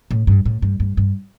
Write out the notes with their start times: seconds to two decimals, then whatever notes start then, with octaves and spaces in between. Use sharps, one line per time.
0.11 A2
0.27 G2
0.46 A2
0.62 G2
0.80 G2
0.97 G2